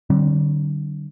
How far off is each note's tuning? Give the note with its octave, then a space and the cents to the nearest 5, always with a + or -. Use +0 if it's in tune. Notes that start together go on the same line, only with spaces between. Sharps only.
D3 +25 G3 -40 C4 +45